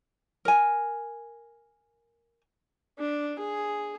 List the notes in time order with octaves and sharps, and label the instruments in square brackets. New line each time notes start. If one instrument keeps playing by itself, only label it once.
[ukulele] A#4 G#5
[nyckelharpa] D4
G#4